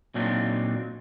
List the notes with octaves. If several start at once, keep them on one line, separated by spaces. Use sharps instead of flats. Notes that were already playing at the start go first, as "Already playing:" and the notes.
A#2 F#3 C4 D4 D#4